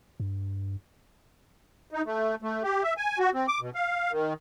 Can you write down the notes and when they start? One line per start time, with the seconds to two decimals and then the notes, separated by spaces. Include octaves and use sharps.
0.20 G2
1.91 D#4
2.06 A3
2.42 A3
2.63 G4
2.83 E5
2.97 G#5
3.19 F#4
3.34 C4
3.48 D6
3.61 B2
3.75 F5
4.11 D#3